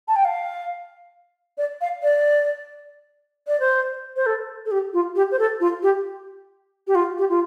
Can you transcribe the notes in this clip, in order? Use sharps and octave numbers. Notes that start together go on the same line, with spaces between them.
A5
G5
F5
D5
F5
D5
D5
C5
C5
A4
A4
G4
F4
G4
C5
A4
F4
G4
G4
F4
G4
F4